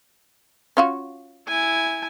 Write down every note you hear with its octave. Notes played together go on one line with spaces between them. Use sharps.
C#4 F4 F#4
E4 G#5